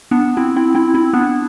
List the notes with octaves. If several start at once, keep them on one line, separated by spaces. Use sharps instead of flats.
B3 D4
C4 E4
C4 E4
C4 E4
C4 E4
B3 D4